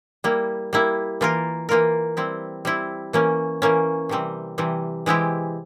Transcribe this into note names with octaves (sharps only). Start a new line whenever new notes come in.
G3 A#3 E4
G3 A#3 E4
E3 A#3 F4 A#4
E3 A#3 F4 A#4
G3 C4 E4
G3 C4 E4
E3 A#3 C#4
E3 A#3 C#4
C3 E3 G3 C4
C3 E3 G3 C4
E3 G#3 C4 E4 G4